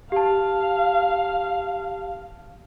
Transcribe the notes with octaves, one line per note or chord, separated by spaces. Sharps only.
G4 F5 A5